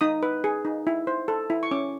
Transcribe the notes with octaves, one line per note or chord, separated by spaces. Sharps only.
D#4 D#6
B4
G#4
D#4
E4
C5
A4
E4
C#6
C#4 D6